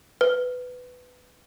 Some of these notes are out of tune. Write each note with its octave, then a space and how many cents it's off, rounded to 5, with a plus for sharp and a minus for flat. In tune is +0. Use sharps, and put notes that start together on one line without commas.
B4 +15